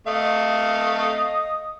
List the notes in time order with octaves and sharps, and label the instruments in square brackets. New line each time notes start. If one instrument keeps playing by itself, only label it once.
[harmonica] A3 F5 [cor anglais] D#5